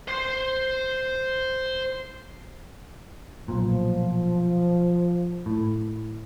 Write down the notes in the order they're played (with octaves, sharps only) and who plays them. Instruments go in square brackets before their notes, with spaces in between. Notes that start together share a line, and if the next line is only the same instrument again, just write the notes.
[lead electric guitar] C5 C6
[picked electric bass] B1 A#2 [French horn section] F3
[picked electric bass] A2